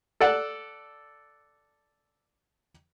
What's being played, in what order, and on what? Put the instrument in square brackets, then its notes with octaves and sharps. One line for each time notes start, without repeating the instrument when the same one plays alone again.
[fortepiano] A4 D5 F#5 A5